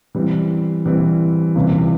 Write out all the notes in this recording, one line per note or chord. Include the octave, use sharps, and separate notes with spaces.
E3 G3 C4
E3 G3 C4
C#2 C3 E3 G3 C4